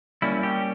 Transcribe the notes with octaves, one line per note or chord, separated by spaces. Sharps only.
G3 A#3 C#4 E4
G4